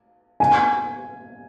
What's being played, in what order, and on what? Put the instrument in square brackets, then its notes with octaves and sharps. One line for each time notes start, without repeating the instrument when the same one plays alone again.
[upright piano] G#5